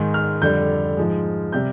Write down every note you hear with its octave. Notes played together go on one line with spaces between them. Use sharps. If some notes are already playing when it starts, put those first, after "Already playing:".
Already playing: G#2 D#3 G#3
F6
F2 D3 G3 G6
G#2 F3 G#3
C3 G3 G6